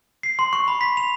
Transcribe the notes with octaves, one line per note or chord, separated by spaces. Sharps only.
C7
C6
C#6
B5
B6
F7